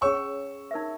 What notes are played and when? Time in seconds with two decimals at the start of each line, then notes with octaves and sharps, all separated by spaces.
0.01 C#4 G#4 C#5 G#5 C#6 E6
0.71 D#4 A#4 E5